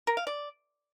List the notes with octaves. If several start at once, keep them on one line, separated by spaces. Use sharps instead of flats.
A#4
F5
D5